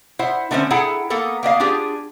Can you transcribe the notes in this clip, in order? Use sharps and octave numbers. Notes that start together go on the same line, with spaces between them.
E4 C5 F#5
D3 A3 C4 C#4 A#4 C5
E4 G#4 A4 F#5 G5 A#5
A#3 B3 A4 A#4
A#3 B3 D#5 F5
D4 F4 G4 G#4